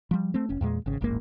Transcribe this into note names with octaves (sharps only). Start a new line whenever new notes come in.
F3 G3
A3 C4
F1 C#4
E2 A#2 G#3
G#1 C#3
D#1 A1 G#2 A#3